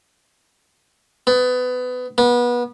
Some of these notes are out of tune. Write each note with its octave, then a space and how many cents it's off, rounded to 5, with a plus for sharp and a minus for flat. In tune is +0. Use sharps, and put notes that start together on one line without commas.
B3 +25
B3 -25